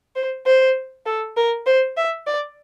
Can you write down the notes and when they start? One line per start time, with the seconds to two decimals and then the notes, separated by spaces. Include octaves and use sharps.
0.16 C5
0.46 C5
1.06 A4
1.37 A#4
1.66 C5
1.97 E5
2.27 D5